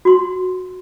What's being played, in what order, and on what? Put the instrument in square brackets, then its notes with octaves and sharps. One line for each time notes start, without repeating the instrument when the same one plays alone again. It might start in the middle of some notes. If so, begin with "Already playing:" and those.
[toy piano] F#4 C6